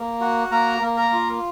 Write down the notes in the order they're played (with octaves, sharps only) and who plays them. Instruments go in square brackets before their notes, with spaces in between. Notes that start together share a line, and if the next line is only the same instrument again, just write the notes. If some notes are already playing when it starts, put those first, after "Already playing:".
Already playing: [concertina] A#3
F#4
A#3 A#4 A#5
A#3
A#4 A#5
F4